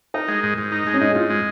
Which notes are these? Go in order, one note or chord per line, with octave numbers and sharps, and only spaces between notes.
D#4 A#4
G#3
G#2
G#2
D#4
G#3
C#4
G#2 D#4
G#4
G#2 F4
G#3